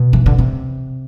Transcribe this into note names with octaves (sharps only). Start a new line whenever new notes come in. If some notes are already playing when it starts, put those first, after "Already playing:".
Already playing: B2
E3
D3
C3